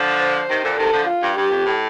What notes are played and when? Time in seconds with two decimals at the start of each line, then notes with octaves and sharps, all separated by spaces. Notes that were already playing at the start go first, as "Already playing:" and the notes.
Already playing: D3 F3
0.20 C5
0.49 C3 D#3
0.64 A#2 D3
0.78 C3 D#3 A4
0.93 D3 F3
1.07 F4
1.22 G2
1.37 G2 G4
1.51 F2
1.66 A2